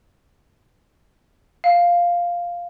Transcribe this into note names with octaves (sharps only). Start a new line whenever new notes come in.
F5